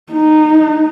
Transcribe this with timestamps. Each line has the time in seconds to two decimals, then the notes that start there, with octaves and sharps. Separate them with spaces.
0.12 D#4